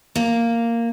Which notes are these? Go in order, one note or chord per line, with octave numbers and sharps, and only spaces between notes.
A#3